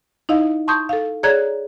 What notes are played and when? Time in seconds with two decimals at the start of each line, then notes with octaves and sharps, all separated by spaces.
0.29 D#4 E4 D#5 F5
0.68 A5 C6 C#6 D#6 G6
0.89 A4 F5
1.23 G#4 C#5 D5 A#5 F#6 G#6